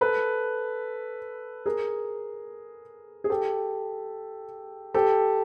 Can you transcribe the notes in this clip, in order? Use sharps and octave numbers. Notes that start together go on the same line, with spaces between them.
A4 B4
G#4 A#4
G#4
G4 A4
G4 A4